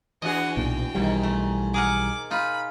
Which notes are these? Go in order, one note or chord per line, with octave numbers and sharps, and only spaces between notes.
E3 D4 F#4 G#4 D#5 F#5
B1 A#2 G5
B1 G#2 B2 D#3 E3 G3
A3
G#4 A#4 F#5 D6
D#4 F4 B5